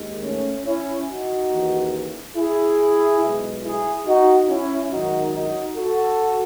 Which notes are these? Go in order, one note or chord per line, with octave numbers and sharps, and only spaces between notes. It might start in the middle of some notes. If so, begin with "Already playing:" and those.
Already playing: D#2 D#3 G#3
A3 C#4
C#4 E4
D#4 F#4
D#2 C#3 E3
E4 G#4
B1 B2 G#3
E4 G#4
D#4 F#4
C#4 E4
G#1 F#2 D#3 F#3 D#4 F#4
D#4 F#4
F#4 A4